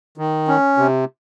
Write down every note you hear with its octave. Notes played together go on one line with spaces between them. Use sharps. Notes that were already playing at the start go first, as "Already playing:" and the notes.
D#3
C#4
C3